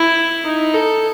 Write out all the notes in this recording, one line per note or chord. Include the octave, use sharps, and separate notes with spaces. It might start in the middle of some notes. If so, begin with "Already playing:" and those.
Already playing: E4
D#4
A4